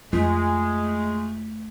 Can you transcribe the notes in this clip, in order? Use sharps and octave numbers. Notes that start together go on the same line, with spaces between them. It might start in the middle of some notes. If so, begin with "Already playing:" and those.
F2 G#3 A3 F4